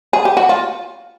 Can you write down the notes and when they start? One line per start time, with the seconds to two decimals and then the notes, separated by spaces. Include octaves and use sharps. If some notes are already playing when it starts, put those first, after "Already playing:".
0.13 G#4
0.25 G4
0.37 F#4
0.49 F4